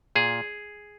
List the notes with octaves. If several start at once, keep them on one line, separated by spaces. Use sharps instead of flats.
A#2 G#4